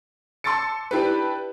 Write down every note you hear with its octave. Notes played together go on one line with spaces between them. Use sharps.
A5 C6 D6 E6 A6 C#7
D4 E4 G4 B4